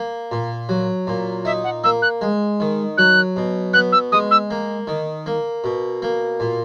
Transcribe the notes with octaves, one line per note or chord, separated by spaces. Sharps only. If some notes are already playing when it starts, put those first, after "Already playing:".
Already playing: A#3
A#2
F#3
A#2
D#4 E5
F#5
A#3 E6
F#6
G#3
D#3
F#3 F#6
B2
B3 F#6
E6
G#3 D#6
E6
A#3
D#3
A#3
B2
A#3
A#2